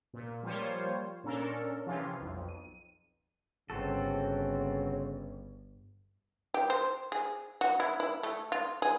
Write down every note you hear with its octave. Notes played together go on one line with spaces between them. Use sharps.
A#2
F3 G3 A#3 F4 C5 C#5
A#2 C#4 D4 A4 A#4
C3 E3 F3 C#4 F4
B1 F2
D#7
G1 C#3 C4 F#4 A4
G4
C5
G#4
F#4
E4
E4
A3
F4
G#4